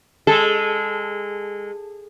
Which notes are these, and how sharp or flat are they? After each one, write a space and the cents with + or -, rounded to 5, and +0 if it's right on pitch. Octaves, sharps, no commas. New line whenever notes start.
G#3 -20 A4 -15